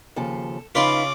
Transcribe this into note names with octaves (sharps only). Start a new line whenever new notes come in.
D#2 C#3 F3 A4
C#3 D#4 F4 B4 E5 B5 C6 D6